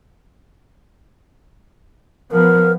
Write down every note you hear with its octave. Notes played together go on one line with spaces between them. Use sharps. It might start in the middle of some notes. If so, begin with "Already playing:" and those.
F3 B3 A#4